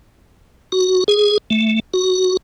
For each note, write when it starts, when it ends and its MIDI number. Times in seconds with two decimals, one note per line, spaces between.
0.72 1.04 66
1.08 1.38 68
1.50 1.80 57
1.94 2.37 66